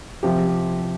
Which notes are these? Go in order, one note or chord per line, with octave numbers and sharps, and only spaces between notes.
C3 F3 G4